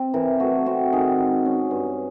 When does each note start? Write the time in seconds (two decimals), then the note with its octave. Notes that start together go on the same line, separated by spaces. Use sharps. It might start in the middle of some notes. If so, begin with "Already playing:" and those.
Already playing: C4
0.14 E3 A#4
0.40 A3 F#4
0.66 C4 F#4
0.93 D#3 G#4
1.19 G#3
1.45 C#4
1.71 G2